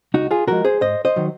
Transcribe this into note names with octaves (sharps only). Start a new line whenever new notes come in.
C#2 D#4 F#4
F4 G#4
C3 F3 G#3 F#4 A#4
G#4 C5
G#2 C5 D#5
C5 D#5
D#3 F#3